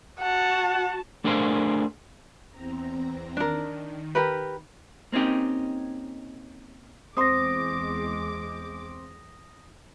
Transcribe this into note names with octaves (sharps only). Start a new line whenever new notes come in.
F#4 F#5 A5
A3 D4 G#4 A#4 C5 F5
E2 C4 A#5
D#3 D4 A#4
G4 A#4 B4
A#3 C4 C#4 D#4 G4
E2 G#3 C4 C5 C6 D6 D#6 A#6